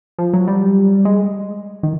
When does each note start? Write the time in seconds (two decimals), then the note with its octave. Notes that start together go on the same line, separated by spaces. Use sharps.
0.18 F3
0.33 F#3
0.48 G3
1.05 G#3
1.83 D#3